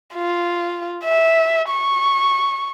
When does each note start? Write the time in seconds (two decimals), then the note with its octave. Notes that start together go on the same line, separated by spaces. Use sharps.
0.14 F4
1.04 E5
1.69 C#6